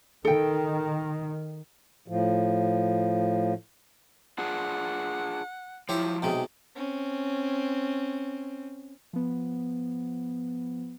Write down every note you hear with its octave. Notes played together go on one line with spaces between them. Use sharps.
D#3 A4 G5
A2 F3
D4 F4 G#4 F#5
F3 F#3 E4 G4 C#5
B1 C3 G#3 G5
C4 C#4
F3 B3